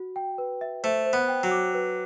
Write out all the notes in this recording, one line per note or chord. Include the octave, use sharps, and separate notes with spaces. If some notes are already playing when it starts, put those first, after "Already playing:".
Already playing: F#4
G5
B4
E5
A3 C5
C5
B3
G5
F#3
D6
B4